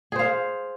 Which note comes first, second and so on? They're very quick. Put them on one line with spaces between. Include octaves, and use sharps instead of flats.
G#4 C5 F5